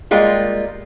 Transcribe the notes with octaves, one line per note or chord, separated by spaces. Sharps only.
G3 G#3 A#3 F4